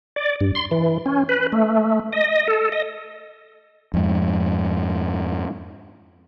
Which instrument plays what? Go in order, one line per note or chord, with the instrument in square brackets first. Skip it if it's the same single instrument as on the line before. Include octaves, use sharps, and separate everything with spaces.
[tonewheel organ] D5
G2
C6
E3
C#4
B4
A3
D#5
A4
D#5
[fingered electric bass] F2 G#2